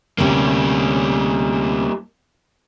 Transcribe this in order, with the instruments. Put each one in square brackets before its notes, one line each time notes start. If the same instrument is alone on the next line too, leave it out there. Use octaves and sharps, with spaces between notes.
[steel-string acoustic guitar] D2 C3 C#4 [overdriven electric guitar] G3 A#3